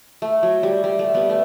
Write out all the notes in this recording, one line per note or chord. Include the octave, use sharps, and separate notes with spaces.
A3
F#3
G3
G3
A3
G3 B3
A3